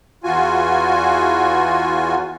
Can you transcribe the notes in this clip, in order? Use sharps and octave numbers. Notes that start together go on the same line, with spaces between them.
E2 F4 F#4 G#5